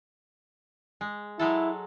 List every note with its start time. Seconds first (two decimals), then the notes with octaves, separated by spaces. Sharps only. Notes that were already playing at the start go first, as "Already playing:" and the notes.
1.01 G#3
1.39 F#3 G#3 E4 A4